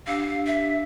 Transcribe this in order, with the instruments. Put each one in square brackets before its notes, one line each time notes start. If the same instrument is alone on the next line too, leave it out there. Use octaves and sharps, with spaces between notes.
[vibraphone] D4 G4 E6 [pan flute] F5
[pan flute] E5